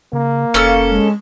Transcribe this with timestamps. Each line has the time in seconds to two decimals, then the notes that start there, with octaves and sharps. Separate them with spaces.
0.13 C#3 A#3
0.54 F1 C#4 A4 F5
0.89 G#3